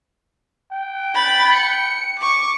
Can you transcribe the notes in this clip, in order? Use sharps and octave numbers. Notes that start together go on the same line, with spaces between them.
G5
B5 A6
C#7
C#6 D6